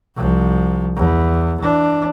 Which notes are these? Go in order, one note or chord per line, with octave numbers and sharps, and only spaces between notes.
C2 F3
E2
E3 D4